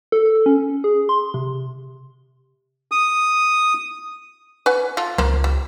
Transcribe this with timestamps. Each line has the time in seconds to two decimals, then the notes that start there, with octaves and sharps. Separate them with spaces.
0.12 A4
0.46 C#4
0.84 G#4
1.09 C6
1.34 C3
2.92 D#6
4.66 B4 F#5 G#5
4.97 F4 A4
5.18 C#2 A#3 C5
5.44 G3